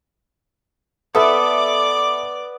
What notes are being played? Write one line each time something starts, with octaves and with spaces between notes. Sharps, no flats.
B3 A4 D5 E5 D6